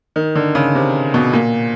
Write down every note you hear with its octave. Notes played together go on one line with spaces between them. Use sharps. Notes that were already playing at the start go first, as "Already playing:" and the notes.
D#3
D3
C#3
C3
B2
A#2